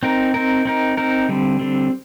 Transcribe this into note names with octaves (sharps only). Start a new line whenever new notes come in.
C4 D#4 A#4
C4 D#4 A#4
C4 D#4 A#4
C4 D#4 A#4
D3 G3 C4
D3 G3 C4